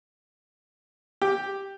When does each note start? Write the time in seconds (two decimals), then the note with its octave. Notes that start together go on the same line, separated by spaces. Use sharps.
1.22 G4